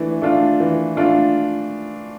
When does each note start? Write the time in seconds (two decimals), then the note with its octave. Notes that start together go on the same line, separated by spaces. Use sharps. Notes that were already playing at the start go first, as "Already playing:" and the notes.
Already playing: E3 A3 D4
0.22 A3 D4 F4
0.60 E3
0.97 A3 D4 F4